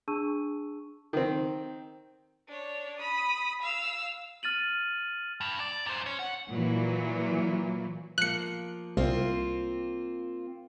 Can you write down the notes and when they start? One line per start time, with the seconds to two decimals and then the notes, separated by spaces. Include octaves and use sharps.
0.08 D4 G#4 A5 C#6 E6 D#7
1.13 D#3 C4
2.48 D4 C#5
2.99 B5 D#6
3.62 F5 E6
4.43 F6 A6 D#7 F#7
5.41 G2
5.60 D5
5.86 F#2 C5
6.06 C#4 C#5
6.19 F#5
6.51 A#2 E3 F#3
8.18 F3 A#3 F#6 C#7
8.97 C2 A#3 C4 F4